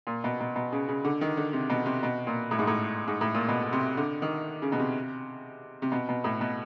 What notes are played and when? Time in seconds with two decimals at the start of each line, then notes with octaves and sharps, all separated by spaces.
0.07 A#2
0.24 B2
0.40 B2
0.56 B2
0.72 C#3
0.88 C#3
1.04 D3
1.21 D#3
1.37 D3
1.53 C3
1.70 B2
1.86 C3
2.03 B2
2.27 A#2
2.51 A2
2.59 G#2
2.67 A2
3.08 G#2
3.21 A2
3.34 A#2
3.48 B2
3.73 C3
3.97 D3
4.22 D#3
4.62 C#3
4.72 B2
4.79 C3
5.82 C3
5.92 B2
6.09 B2
6.24 A2
6.41 B2